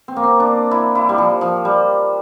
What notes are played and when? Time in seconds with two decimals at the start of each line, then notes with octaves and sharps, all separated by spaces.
0.08 C4
0.16 A#3
0.23 C4
0.40 D4
0.71 E4
0.95 E4
1.09 G3
1.18 F3
1.41 F3
1.65 G3